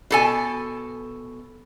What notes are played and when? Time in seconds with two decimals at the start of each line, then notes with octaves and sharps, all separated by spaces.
0.11 B2 A4 G#5